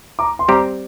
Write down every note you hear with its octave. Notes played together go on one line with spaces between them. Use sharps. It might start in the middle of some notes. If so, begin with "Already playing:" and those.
A#5 D6
C6
G3 C4 G4 A#5 D6